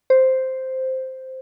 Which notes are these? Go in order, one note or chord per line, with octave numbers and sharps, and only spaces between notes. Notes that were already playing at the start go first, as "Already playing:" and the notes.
C5